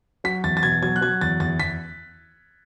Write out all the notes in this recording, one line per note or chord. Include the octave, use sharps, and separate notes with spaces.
F#3 B6
E2 A6
A6
B2 G#6
F#3 G#6
F#6
F#3 G#6
E2 A6
E2 A6
E2 B6